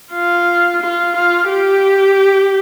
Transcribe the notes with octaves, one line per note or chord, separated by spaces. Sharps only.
F4
F4
F4
G4